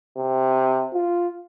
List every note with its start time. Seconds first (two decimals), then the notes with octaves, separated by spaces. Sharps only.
0.17 C3
0.94 F4